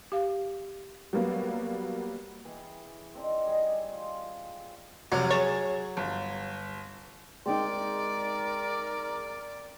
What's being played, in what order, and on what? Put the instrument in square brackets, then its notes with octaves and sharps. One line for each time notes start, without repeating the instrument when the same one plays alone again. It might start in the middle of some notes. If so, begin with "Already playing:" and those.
[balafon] G4 F5
[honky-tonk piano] F#3 G3 A#3 B3
[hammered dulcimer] E3 G#4 G5 B5
C4 D4 D#4
G3 G#4 D#5
F4
[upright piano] F1 C3 C#5 [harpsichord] F#3
[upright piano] G#4 A6 E7 [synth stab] C#5
[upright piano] G1
[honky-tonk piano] G#3 D#4 [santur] C4 G5 [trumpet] A#4 [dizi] D5